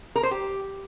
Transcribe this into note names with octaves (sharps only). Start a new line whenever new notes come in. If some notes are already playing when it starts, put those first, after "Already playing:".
A#4
C5
G4